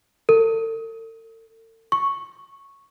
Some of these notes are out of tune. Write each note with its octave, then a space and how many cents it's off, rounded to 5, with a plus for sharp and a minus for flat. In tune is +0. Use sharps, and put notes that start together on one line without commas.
A4 +45
C#6 -5